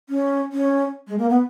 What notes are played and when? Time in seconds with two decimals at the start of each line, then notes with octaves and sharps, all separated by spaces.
0.09 C#4
0.52 C#4
1.08 G#3
1.18 A#3
1.29 B3